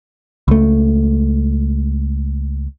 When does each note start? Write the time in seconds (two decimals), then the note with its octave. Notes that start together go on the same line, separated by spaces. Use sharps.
0.48 C#2 A3